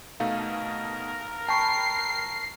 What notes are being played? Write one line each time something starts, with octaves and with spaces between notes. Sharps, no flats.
B2 A3 D#4 A#4 F5
G5 A5 B5 C#6 C7